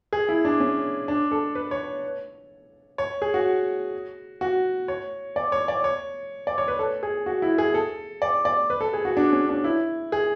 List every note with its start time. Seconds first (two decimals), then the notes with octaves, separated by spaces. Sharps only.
0.13 G#4
0.29 E4
0.45 D4
0.60 C#4
1.08 D4
1.31 A4
1.55 B4
1.71 C#5
2.98 C#5
3.22 G#4
3.34 F#4
4.41 F#4
4.88 C#5
5.36 D5
5.52 C#5
5.68 D5
5.84 C#5
6.47 D5
6.58 C#5
6.68 B4
6.79 A4
7.03 G#4
7.26 F#4
7.42 E4
7.58 G#4
7.74 A4
8.22 D5
8.45 D5
8.70 B4
8.81 A4
8.94 G#4
9.05 F#4
9.17 D4
9.33 C#4
9.49 D4
9.64 E4
10.12 G#4